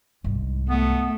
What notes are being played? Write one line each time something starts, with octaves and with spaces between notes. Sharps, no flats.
C2 G#2
A3 B3